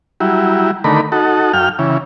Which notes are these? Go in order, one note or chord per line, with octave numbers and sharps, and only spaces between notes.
F#3 G3 E4
D3 D#3 A3 A#4 B5
D#4 F#4 A4
F#2 F5 G5 F6
C#3 E3